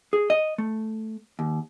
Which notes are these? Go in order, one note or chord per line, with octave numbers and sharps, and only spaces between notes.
G#4
D#5
A3
D#2